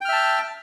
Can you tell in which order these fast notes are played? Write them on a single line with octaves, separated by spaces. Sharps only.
G5 F6 E5 A5